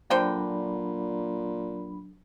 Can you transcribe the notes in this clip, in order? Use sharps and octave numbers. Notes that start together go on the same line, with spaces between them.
A#2 D3 F#3 D4 C5 G5 B5